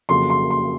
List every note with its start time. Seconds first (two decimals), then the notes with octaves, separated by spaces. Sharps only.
0.09 F2 C#3 F#3 A#3 C6
0.30 C6
0.51 C6